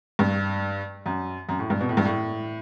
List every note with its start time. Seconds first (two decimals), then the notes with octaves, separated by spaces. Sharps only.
0.19 G2
1.06 F#2
1.49 F#2
1.59 A2
1.70 G2
1.81 B2
1.89 A2
1.97 G2
2.05 A2